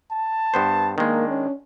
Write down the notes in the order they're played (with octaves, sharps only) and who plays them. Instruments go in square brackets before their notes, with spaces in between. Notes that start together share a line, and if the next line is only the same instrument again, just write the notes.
[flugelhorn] A5
[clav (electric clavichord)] G2 B3 C5
[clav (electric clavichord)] D#3 G#3 [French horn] A#3 [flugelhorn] D4
[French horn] C#4